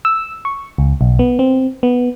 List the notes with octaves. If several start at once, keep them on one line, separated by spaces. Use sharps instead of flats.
E6
C#6
C#2
B1
B3
C4
B3